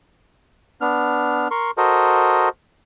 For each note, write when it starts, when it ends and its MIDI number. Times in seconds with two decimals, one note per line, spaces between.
0.81 1.48 59
0.81 1.48 62
0.81 1.48 89
1.51 1.71 70
1.51 1.71 84
1.51 1.71 85
1.78 2.49 66
1.78 2.49 69
1.78 2.49 70
1.78 2.49 72
1.78 2.49 75